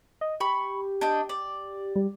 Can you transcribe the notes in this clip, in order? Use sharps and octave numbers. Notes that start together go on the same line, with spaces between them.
D#5
G4 B5 C#6
D4 D#5 G5
D5
G3